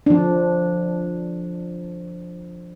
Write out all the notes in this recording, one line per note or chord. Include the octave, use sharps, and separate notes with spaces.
F3 D4